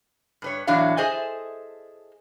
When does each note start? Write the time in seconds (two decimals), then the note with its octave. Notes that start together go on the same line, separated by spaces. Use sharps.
0.42 G2 B4 C#5
0.67 E2 A2 E3 F#3 D4 F5
0.97 G#4 A4 C5 D#5 E5 G#5